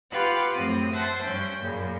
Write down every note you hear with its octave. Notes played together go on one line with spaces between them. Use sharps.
F4 G4 B4 F5 F#5
F#2 A2 C4 D#6
C5 E5 F#5 A5
G2 C#4 G5
F#2 A#2 C#3